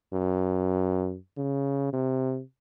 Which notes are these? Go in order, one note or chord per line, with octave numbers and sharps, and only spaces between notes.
F#2
C#3
C3